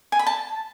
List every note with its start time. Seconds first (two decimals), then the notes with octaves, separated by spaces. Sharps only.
0.12 G#5
0.19 B5
0.27 A5